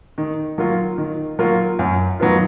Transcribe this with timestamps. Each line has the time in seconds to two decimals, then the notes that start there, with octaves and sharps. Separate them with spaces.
0.18 D#3
0.58 F#3 A#3 F4
0.98 D#3
1.39 F#3 A#3 F4
1.79 F#2
2.20 D#3 F#3 B3 F4